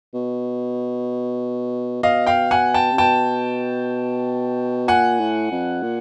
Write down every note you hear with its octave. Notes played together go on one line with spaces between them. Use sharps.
B2
B2 D#5 F5
F5 G5
F#5 G#5
G5 A5
C3
B2 G5 A5
A#2 F#5 G#5
A2
F2
A#2